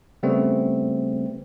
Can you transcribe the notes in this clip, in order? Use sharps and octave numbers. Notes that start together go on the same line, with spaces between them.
C#3 G3 A3 B3 C4